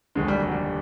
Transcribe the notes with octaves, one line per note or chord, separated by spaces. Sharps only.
F1 D#2 D3 G#3
G3
F#3
G3